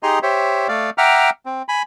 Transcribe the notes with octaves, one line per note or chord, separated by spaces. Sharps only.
D#4 G4 G#4 D#5 A#5 C6
G4 C5 C#5 E5
A3 D5 F5
E5 F#5 G5 A#5 D6 F6
C4
G#5 B5